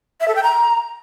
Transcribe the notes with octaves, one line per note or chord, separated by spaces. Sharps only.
E5
A4
G5
A#5